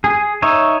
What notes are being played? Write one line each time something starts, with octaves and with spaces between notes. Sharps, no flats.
G#4
D#4 C#5 E5